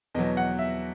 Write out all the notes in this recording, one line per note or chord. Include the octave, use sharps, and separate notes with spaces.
E2 B2 F#3 D#5
F#5
E5